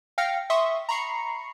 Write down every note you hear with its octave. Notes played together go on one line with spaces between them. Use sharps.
F5 G5 F6 A#6 C#7
E5 C6 C#6 D#6
A#5 B5 C#6 C7 C#7